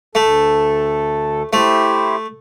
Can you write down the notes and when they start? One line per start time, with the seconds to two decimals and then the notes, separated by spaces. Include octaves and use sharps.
0.15 D2 A3 A4
1.53 A3 E4 G4 C5